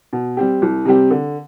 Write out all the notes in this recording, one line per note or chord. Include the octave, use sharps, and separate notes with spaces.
B2
G3 C4 G4
C2
C3 G3 C4 G4
D3